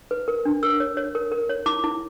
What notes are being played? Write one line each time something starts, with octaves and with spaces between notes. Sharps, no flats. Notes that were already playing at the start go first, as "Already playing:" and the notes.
B4
A#4
D4
A#4 E6
C#5
C#5
A#4
A#4
C#5
E4 D6
E4